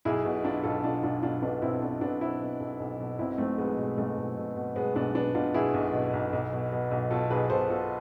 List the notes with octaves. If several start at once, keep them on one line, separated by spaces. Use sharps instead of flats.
B1 E4 G#4
B2
B1 D4 F4
B1 F4 A4
B2 D4 F4
B1 D4 F4
B2 D4 F4
B1 B3 D4
B1 C4 E4
B2 B3 D4
B1 B3 D4
B2 C4 E4
B2
B1
B1
B2
B1 C4 E4
B1 A3 C4
B1 G#3 B3
B2 G#3
B1 A3
B1
B2
B2
B2 G#3 B3
B1 B3 D4
B2 B3 D4
B2 D4 F4
B2 E4 G#4
B1
B2
B1
B1
B2
B2
B1
B2 F4 A4
B1 G#4 B4
B2 A4 C5
B2 F4 A4